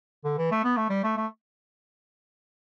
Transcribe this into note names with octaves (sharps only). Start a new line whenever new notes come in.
D3
E3
A3
B3
A3
G3
A3
A3